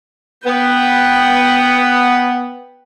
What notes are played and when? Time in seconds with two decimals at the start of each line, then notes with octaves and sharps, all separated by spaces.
0.46 B3 B4 G5